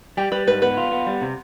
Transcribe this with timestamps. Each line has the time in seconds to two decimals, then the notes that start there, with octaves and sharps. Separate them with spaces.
0.17 G3 G4
0.32 G3 B4
0.47 G#2 B4
0.62 B3 B4
0.77 F4
0.92 B3
1.07 G3
1.22 C3